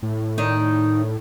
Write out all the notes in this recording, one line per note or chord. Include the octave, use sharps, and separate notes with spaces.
A2
D#3 D#4 D5